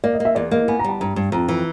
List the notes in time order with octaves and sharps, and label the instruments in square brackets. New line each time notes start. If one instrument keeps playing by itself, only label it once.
[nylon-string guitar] A#3 [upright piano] D5
[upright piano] D#5
[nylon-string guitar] A#3 [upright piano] E5
[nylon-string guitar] E2 [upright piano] D5
[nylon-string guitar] A#3 [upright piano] D#5
[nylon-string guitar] B3 [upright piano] G#5
[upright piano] A#5
[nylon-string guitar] G3 [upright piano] A5
[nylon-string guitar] G2 [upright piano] A#5
[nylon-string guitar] G2
[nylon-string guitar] F2 [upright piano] A#5
[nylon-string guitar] E3